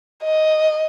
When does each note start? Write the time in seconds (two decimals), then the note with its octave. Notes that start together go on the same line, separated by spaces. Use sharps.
0.24 D#5